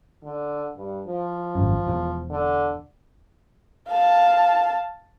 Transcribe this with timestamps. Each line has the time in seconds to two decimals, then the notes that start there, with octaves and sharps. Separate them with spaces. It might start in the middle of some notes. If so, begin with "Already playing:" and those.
0.23 D3
0.76 G2
1.07 F3
1.55 G#1 F#2
1.86 E1 E2
2.30 D3
3.88 F5 A5